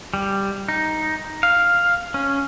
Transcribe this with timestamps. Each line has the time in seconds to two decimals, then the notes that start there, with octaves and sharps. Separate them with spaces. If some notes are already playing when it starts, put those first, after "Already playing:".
0.14 G3
0.68 D#4
1.43 F5
2.14 C#4